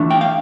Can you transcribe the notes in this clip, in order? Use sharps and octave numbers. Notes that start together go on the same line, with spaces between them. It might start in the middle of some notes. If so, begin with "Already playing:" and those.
Already playing: E3 A3 D4
G5
F5